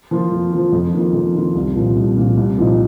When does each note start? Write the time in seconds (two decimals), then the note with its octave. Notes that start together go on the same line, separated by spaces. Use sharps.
0.11 F3 A#3 F4
0.32 F2
0.52 F3 A#3 F4
0.72 F2
0.93 D#3 A#3 F4
1.14 F2
1.35 D#3 A#3 F4
1.55 C2
1.75 A#2 F3
1.96 C2
2.17 A#2 F3
2.37 C2
2.58 A#2 F3 D#4